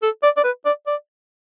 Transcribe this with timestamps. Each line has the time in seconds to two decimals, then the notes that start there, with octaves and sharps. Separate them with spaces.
0.03 A4
0.23 D5
0.37 D5
0.44 B4
0.65 D5
0.87 D5